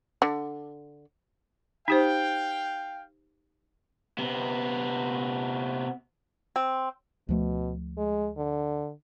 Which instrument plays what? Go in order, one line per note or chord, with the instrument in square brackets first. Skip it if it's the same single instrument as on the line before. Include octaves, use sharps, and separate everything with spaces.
[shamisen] D3
[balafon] D#4 G4 C5 [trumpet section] F5 G5
[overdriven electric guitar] C3 B3
[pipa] C4
[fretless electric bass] D2 F3 A3 [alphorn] B2
[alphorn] G#3
D3